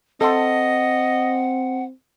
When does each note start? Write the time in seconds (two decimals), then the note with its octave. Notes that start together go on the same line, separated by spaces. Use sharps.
0.21 C4 A4 D#5 F#5 C6